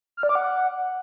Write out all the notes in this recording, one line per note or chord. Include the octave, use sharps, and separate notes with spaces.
F6
D5
D6
F#5